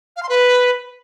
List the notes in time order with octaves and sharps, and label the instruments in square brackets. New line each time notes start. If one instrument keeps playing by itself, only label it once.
[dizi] F5
C6
B4